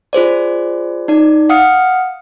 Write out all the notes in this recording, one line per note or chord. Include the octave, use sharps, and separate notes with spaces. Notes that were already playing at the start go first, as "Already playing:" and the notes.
F4 G#4 C5 D5
D#4 D5
F5 F#5 D#6 F6 C#7